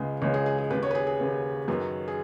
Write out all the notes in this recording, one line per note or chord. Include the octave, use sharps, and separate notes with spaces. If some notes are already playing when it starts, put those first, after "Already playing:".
Already playing: C#2 C#3 G#3 B3
C#2 C#3 G#3 B3 C#5
G#4
G#4
G#4
D#2 C#3 B3 B4
C#5
B4
G#4
G#4
D#2 C#3 B3
F#2 D#3 F#3 B3
G#4